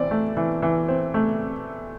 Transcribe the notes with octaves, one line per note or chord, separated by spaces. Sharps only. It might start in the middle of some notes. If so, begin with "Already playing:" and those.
Already playing: E3 C4 D5
A3
E3
E3
C4
A3